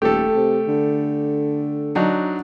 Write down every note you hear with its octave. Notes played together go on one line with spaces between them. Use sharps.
D#1 A3 G4 A4
C3
D3
F#3 D4 D#4